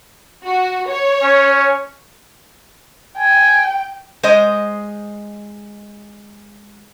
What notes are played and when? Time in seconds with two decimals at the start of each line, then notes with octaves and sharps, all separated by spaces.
0.45 F#4
0.87 C#5
1.22 C#4
3.18 G5 G#5
4.23 G#3 C5 D#5